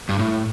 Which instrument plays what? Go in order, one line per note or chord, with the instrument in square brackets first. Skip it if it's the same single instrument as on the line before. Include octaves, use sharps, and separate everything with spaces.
[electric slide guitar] G2
A2